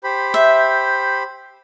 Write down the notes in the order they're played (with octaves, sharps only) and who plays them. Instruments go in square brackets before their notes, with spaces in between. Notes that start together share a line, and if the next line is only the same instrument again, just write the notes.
[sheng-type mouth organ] G4 C5 B5
[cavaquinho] E5